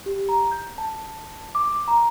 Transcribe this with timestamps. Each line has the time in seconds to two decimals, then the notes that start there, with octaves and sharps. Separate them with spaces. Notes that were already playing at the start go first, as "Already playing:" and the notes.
0.06 G4
0.29 A#5
0.51 G6
0.78 A5
1.55 D6
1.88 A#5